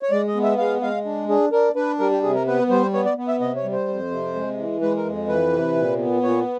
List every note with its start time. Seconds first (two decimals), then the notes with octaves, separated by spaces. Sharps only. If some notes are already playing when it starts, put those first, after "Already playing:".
0.02 C#5
0.11 G#3 D5
0.27 D#5
0.35 B3
0.43 E5
0.58 G#3 F5
0.82 G#3 F5
1.05 D4
1.29 D4 G#4
1.52 D4 A#4
1.75 D4 B4
1.99 G3 A#4
2.11 G4
2.23 C3 G#4
2.35 A#4
2.47 B3 B4
2.69 G3 C5
2.93 B3 C#5
3.05 D5
3.17 B3
3.28 E5
3.40 C3 D#5
3.56 C#5
3.63 G3
3.72 C5
3.88 F2
4.11 C3
4.35 G#3
4.58 E3
4.81 G#3 B4
4.97 A#4
5.04 F2
5.28 E3 B4
5.52 C3
5.76 A#2
5.99 B3
6.22 A#2 C#5